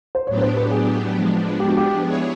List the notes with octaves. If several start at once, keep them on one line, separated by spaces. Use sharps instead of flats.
C5
A2 F#3 B3 D4 G4 C#5
B4
C5
B4
G#4
F3 G#3 B3 D4
G4
F#4
G4
B3 E4 G#4 C#5